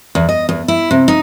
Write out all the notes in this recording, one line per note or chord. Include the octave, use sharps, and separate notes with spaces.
E2
D#5
E2
E4
C3
D#4